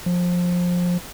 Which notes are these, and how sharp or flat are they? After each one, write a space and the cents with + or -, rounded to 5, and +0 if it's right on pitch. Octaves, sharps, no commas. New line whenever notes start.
F3 +20